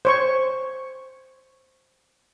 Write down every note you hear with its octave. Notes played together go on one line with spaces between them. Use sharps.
C5 C#5 C#6